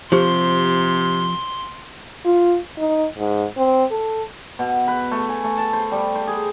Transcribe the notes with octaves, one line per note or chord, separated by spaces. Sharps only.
C3 F3 G4 C5 C6
F4
D#4
G#2
C4
A4
B2
B4
A3
G#5
A3
A5
C5
G3
C5
G#4